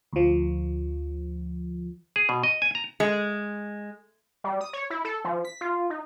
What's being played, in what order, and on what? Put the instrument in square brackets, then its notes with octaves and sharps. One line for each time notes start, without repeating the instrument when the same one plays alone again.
[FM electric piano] D2 F3
[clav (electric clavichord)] G#4
B2
D#5
G#5
A#5
[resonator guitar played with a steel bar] G#3
[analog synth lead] G3
D#6
C#5
E4
A4
F3
B6
F4
D#4